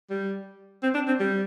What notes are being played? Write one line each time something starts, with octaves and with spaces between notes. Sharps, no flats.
G3
C4
D4
C4
G3